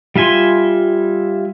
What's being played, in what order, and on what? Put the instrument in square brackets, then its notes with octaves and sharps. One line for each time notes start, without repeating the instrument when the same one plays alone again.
[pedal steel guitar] G3 F4 E5 G#5 C6